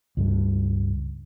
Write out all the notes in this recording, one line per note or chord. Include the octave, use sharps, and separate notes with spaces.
C#2 G2